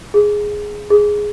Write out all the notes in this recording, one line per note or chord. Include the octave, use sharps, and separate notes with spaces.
G#4
G#4